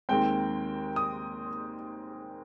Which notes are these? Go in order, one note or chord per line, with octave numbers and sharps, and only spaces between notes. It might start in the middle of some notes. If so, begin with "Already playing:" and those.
D#2 D#3 G#3 C4 G5
D#6